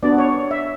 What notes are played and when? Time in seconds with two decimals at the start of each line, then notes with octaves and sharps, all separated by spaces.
0.03 B3 D4 F#4 D5
0.18 C#5
0.51 E5